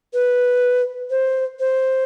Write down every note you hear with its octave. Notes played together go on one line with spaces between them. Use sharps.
B4
C5
C5